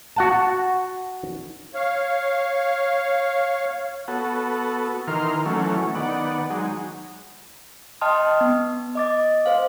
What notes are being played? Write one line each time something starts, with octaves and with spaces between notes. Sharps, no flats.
F#4 F#5 A5
C#5 F5
B3 F#4 A4
D#3 E3 A#4 C6 F6
E3 F#3 A3 C#4
D#3 B3 D5 F#5
F#3 G#3 D#4
D#5 G5 A5 C6 D#6 F6
B3
D#5 D6 A6
C5 F5